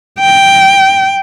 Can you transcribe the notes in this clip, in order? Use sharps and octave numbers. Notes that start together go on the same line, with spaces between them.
G5